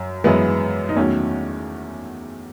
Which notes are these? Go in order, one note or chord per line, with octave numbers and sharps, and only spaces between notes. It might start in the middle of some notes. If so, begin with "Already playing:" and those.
Already playing: F#2
F#2 E3 G#3 B3
D#4
E2 D#3 F#3 A3 C#4